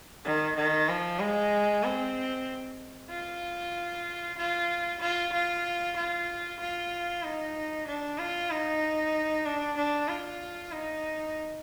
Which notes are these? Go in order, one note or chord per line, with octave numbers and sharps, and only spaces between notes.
D#3
D#3
F3
G#3
C4
F4
F4
F4
F4
F4
F4
D#4
D4
F4
D#4
D4
D4
F4
D#4